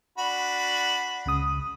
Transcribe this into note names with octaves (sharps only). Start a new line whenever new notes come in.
D4 F#4 B5
C#2 C#3 D#6